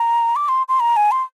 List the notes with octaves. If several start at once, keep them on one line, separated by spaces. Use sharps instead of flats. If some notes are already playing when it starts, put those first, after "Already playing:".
Already playing: A#5
D6
C6
C6
A#5
G#5
C6